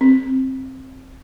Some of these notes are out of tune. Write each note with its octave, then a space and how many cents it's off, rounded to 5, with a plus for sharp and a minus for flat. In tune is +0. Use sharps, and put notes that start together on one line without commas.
C4 +10